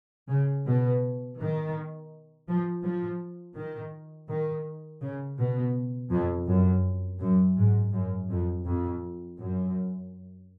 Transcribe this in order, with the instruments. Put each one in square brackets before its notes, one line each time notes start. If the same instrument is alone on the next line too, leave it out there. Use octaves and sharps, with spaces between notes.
[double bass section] C#3
B2
D#3
F3
F3
D#3
D#3
C#3
B2
F2
F#2
F#2
G#2
F#2
F2
F2
F#2